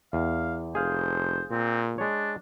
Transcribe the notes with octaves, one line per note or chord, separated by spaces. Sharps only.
E2 F5
F1 G#4 C5 F5
A#2 C4
G#3 D4 C#5